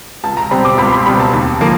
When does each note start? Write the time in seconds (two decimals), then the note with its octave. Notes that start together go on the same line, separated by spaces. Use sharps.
0.24 C#2 A5
0.37 A#5
0.51 B2 G3 C4 B5
0.65 D6
0.78 C#2 B5
0.87 C6
0.93 B5
1.06 B2 G3 C4 B5
1.20 A5
1.33 D#2
1.61 F3 A#3